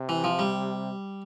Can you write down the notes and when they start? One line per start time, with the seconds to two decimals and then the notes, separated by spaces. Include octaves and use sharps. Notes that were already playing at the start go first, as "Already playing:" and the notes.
Already playing: C3
0.09 E3
0.24 F3
0.39 G3